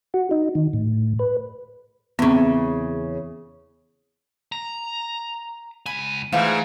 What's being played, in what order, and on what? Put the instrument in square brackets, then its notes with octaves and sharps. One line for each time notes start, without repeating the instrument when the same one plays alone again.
[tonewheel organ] F#4
D#4
D#3
A2
B4
[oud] E2 C#3 [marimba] B3 C4
[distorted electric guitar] A#5
[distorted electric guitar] C#2 G#5 [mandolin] B5
[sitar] G#2 E3 [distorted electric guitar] A3 [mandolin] F4 E5 G6